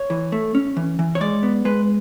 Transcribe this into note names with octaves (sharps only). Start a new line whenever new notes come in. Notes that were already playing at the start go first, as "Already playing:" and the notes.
Already playing: C#5
E3
A3
C#4
E3
E3
C#5
G#3 D5
B3
G#3 B4